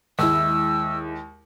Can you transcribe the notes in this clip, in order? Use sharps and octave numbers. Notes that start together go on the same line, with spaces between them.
D#2 G#3 E4 E6